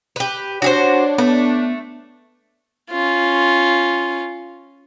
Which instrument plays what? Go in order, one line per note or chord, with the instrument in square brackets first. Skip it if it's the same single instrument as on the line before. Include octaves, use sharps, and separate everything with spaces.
[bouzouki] G4 B4
[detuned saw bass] D4 [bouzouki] F#4 G#4 C5 [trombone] C#5
[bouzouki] A3 [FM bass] B3
[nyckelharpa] C#4 F4